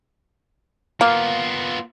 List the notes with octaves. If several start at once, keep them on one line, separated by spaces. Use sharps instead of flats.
A#3 B3 F4